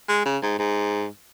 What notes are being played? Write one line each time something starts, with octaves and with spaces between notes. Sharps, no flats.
G#3
C#3
G#2
G#2